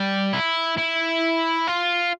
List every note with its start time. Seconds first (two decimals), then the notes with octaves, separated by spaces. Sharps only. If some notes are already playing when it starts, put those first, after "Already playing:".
Already playing: G3
0.33 E4
0.78 E4
1.68 F4